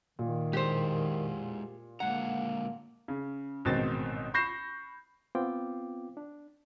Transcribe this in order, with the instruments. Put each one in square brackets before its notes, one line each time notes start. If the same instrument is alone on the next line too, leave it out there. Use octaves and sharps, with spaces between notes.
[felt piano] A#2 [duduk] D#3
[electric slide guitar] G#3 E4 G#4 [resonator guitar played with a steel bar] G4 C5
[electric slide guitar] D3 G#3 A#5 [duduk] A#3 [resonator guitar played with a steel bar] F#5
[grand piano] C#3
A1 G#2 B2 D#3 C4 A6
B5 C#6 G6 A#6 C7 E7
[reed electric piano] B3 C4 F4 G5 D6
D4